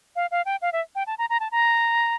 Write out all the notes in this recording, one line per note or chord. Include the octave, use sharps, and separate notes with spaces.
F5
F5
G5
F5
E5
G5
A5
A#5
A#5
A5
A#5